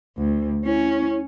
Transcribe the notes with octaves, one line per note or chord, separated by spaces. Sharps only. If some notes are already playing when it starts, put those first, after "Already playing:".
D2
C#4 E4